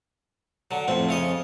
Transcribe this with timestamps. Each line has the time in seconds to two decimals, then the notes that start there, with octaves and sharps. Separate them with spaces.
0.71 D3 F#3
0.88 F2 A2 F3 C4
1.09 C#3 C#5 D#5